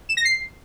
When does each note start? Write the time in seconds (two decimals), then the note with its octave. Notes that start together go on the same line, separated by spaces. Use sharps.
0.09 E7
0.17 A#6
0.25 C7